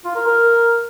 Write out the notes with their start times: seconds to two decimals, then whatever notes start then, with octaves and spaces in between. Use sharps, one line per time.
0.05 F4
0.16 A#4
0.27 A#4